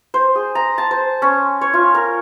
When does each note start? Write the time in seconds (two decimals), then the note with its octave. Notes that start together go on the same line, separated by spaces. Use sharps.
0.14 C5
0.35 G#4
0.55 A#5
0.78 A5
0.91 C5
1.22 C#4
1.61 C#5
1.74 F4
1.95 A#4